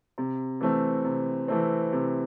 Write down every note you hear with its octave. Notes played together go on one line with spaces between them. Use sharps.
C3
E3 A3 C4
C3
E3 A3 C4
C3